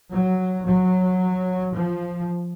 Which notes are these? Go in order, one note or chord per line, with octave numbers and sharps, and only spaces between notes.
F#3
F#3
F3